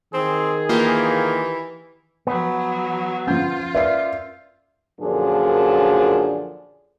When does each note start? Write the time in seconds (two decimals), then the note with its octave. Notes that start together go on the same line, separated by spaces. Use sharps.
0.14 D#3 C4 G#4
0.69 E3 A#3 F4 G4
2.27 F3 F#3 B3
3.27 F3 C#4 F4 G6
3.74 A#4 B4 D5 E5 F5 C7
5.01 F#2 A#2 D3 F3 D4 G#4